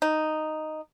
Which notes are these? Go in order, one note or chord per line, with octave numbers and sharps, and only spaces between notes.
D#4